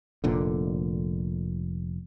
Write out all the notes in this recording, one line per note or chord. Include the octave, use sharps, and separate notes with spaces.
F1 A#2 D3